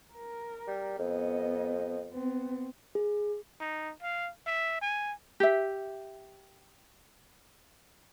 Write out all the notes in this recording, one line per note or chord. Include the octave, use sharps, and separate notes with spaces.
A#4
G3
F2 B3 D#5
B3 C4
G#4
D#4
F5
E5
G#5
G4 E5